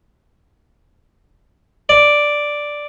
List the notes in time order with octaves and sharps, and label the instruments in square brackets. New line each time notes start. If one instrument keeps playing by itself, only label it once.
[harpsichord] D5